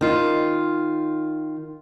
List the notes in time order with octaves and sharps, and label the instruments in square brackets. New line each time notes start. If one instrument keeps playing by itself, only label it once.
[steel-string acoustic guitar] D#3 F4